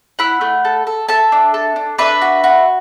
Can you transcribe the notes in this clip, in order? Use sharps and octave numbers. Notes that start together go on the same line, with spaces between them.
E4 F#5 B5
A3
A4
A4
A4 E5 A5
D4
A4
D4
D4 B4 E5
F#4
F#4